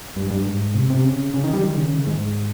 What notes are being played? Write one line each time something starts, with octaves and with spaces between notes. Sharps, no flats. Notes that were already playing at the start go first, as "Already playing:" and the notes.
G2
G2
G#2
C3
C3
C#3
C#3
D#3
G3
D#3
C#3
D#3
G#2